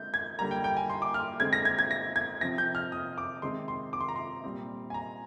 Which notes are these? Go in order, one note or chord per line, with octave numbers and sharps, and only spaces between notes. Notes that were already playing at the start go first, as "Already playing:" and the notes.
Already playing: D3 G#3 C4 G6
G#6
D3 G3 A#3 A#5
G5
G5
G#5
C6
D6
F6
D3 G#3 C4 G#6
A#6
G#6
G#6
A#6
G#6
C3 F3 C4 A#6
G6
F6
D#6
D6
C3 D#3 G#3 C4 C6
C6
D6
C6
A#5
C6
A#2 G3 C4
G#5
A#5